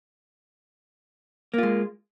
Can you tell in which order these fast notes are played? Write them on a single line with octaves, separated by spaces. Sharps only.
A#3 F4 G#3